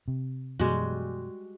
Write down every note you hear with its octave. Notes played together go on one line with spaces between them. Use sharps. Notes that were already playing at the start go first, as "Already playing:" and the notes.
C3
F#2 B2 E3 G3 G#3 F#4